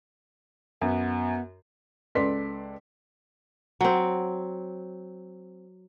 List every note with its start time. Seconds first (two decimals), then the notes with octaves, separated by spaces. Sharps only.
0.81 F#2 B3
2.15 C#2 A4 B4 D5 C6 B6
3.81 F#3 C4